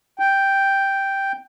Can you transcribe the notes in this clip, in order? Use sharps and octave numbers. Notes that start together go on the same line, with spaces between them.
G5